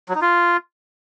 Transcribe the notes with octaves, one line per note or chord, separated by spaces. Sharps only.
F#3
D#4
F4